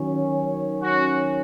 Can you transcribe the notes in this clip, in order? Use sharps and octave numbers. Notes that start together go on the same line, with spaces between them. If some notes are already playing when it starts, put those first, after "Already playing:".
Already playing: D#3 F#3 C#4
F#4